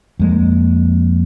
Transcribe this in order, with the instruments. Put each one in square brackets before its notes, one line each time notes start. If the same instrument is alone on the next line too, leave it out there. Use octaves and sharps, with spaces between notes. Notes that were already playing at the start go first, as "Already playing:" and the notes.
[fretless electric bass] F2 G#3 A#3